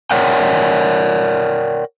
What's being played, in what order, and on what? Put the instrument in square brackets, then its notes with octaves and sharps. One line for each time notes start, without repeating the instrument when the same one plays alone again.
[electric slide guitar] A#4 C#5 D5 F#5 G5